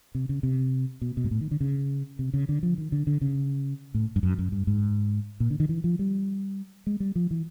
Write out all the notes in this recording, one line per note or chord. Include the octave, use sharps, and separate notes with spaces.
C3
C#3
C3
B2
B2
G#2
A2
D#3
D3
C#3
C3
C#3
D3
F3
D#3
D3
D3
C#3
A2
G2
F#2
F#2
G2
G#2
A#2
D3
D#3
E3
F3
G3
G#3
G3
F3
E3